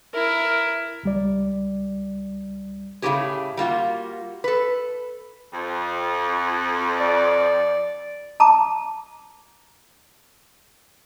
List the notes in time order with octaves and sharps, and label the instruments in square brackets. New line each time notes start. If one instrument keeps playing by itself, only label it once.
[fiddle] E4 [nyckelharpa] A#4
[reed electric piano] C#2 G3 D5
[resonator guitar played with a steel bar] A2 C#3 A3 C4 G4 G#4
G3 A#3 F4 F#4
A4 B4
[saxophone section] F2
[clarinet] D5
[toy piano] A5 A#5 D6